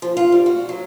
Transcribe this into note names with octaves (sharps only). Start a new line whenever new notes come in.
F3
F4
G3
F#4
F#3